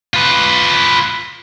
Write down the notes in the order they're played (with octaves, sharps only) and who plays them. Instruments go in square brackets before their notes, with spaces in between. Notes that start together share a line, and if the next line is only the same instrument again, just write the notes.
[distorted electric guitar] F4 B4